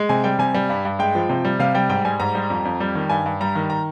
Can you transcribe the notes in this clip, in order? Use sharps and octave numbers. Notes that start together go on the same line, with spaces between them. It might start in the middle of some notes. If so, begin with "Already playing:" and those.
Already playing: G#3
C3 G#5
G3 G5
C3 G#5
G3
G2
G2
G#3 G5
F3
C3
G3
C3 F5
G3 G5
G#2 G5
G3 G#5
G#2 A#5
G3
F2
F2
G3
D#3
G2 G#5
G2
G3 A#5
D#3
A#5